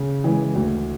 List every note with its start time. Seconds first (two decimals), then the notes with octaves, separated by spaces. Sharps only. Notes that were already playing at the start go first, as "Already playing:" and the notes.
Already playing: C#3
0.24 E3 G#3
0.55 D2